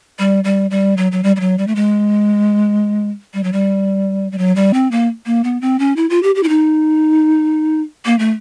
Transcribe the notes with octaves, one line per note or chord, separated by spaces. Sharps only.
G3
G3
G3
F#3
F#3
G3
G3
F#3
G3
A3
G#3
G3
F#3
G3
G3
F#3
G3
C4
A#3
A#3
B3
C4
C#4
E4
F4
G4
G4
E4
D#4
A#3
A3